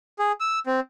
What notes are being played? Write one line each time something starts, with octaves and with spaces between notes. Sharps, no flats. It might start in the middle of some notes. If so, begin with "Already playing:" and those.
G#4
E6
C4